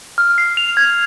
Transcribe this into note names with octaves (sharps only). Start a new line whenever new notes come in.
F6
C7
F7
G#6